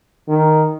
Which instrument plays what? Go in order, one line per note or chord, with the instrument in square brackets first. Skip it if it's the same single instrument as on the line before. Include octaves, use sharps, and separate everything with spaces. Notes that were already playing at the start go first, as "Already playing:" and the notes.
[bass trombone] D#3